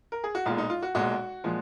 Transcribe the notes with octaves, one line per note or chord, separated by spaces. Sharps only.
A#4
G#4
F#4
B1 A#2 G#3 F4
D#4
F4
F#4
B1 A#2 G#3 F#4
A#2 F3 G#3